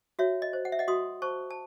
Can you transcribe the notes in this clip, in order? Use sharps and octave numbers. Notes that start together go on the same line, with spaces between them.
F#4 C#5 E5
D#5
C5
F#5
E5
D#5 F#5
F#4 C6 D#6
C5 A5 C#6
A5